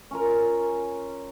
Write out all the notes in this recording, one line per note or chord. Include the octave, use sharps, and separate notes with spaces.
C#4 F4 A#4